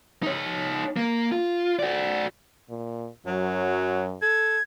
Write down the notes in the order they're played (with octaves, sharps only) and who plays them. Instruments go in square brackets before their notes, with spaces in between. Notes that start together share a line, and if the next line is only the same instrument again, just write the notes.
[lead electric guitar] D#4 C#5
A#3
F4
F#4 D5
[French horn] A#2
[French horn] F#2 [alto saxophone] F#3
[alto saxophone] A4 [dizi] G#6